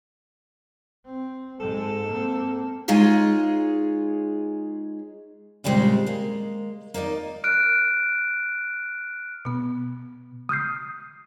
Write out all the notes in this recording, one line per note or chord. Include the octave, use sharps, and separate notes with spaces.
C4
G#2 G#3 A4
A#3 C4
G#3 D#4 F4 G#4 C#5
A#2 C#3 G3 G#3 C4
G#3 A#3
A#3 D#4 D5 D#5
F6 F#6 D7
B2 B3
D#6 F6 G6 C7